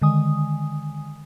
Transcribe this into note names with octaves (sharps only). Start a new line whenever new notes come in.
D3 D#3 G#3 G#5 D#6